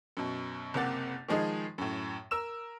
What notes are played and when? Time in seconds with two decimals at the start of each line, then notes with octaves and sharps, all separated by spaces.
0.17 F#2 B2
0.74 F#1 C3 A#3 F#5 A6
1.28 D#3 F3 G#3 D#4 G#4
1.78 F#2 A2
2.31 A#4 E6 E7